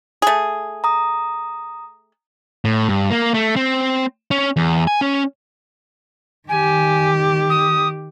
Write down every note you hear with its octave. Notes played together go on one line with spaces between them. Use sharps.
A3 G#4
A#5 D#6
A2
G2
A#3
A3
C4
C#4
E2
G#5
C#4
D#3 G4 G#5
D#6